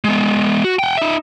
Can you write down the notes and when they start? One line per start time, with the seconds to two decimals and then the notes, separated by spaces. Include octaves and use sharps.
0.04 G#3 B3
0.64 F#4
0.79 F#5 G5
0.97 D#4 E5